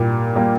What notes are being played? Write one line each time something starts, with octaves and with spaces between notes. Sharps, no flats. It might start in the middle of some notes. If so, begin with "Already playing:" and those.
Already playing: A#2 G3 A#3
G3 A#3